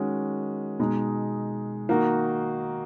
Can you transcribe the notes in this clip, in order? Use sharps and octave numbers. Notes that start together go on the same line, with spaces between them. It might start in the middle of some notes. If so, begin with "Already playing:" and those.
Already playing: D#3 G#3 C#4 F#4
B2 G#3 D#4
D#3 A#3 D#4 F#4